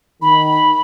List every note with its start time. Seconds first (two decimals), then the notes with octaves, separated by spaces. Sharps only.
0.22 D#3 B5